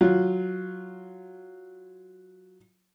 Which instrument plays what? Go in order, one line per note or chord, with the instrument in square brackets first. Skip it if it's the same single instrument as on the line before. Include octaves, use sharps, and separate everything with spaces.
[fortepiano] F#3 F4